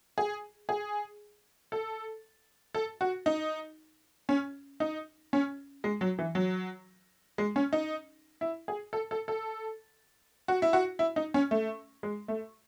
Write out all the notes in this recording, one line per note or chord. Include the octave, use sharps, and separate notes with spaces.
G#4
G#4
A4
A4
F#4
D#4
C#4
D#4
C#4
G#3
F#3
E3
F#3
G#3
C#4
D#4
E4
G#4
A4
A4
A4
F#4
E4
F#4
E4
D#4
C#4
A3
G#3
A3